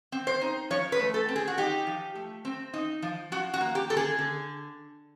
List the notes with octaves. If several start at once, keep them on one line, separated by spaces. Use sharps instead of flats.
C4
C5
D#4
F3 C#5
B4
A3
A4
C4
G#4
F#4
D#4 G4
F3
A3
C4
D#4
F3
F3 F#4
F#4
A#3
G4
D3 A4
G#4
D3